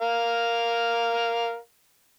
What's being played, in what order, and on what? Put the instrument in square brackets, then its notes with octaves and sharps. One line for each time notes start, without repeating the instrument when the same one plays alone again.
[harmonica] A#4 F5